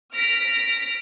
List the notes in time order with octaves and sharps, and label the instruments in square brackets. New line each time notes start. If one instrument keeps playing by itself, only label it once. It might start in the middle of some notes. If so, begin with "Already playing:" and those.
[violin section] F6 A#6 B6 D7